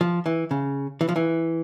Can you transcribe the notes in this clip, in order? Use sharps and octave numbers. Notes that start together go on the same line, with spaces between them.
F3
E3
C#3
E3
F3
E3